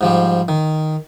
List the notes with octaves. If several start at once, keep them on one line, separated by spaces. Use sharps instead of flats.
G#2 F3 G3
D#3